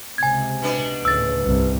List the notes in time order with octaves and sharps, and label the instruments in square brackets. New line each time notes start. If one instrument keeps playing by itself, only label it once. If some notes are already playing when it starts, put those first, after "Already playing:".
[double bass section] C#2 C3 [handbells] G#5 G#6
[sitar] B2 B3 D4
[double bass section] D2 A2 C#3 [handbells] E6 A6
[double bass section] C2 G2 C3